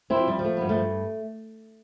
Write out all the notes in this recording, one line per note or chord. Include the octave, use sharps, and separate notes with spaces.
C4 E4
F3
G3
F3
A3
G2 B3
F3 A3